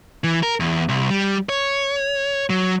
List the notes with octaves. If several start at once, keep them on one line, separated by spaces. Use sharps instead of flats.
E3
A#4
E2
C2
G3
C#5
F#3